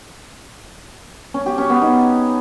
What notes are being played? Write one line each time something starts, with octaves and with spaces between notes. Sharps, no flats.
C#4
G4
C#4
B3
D#4